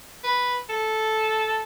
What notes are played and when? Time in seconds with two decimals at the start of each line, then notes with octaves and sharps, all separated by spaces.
0.24 B4
0.69 A4